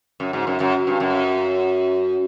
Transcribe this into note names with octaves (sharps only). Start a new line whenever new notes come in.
F#2
G#2
F#2
F#2
G2
F#2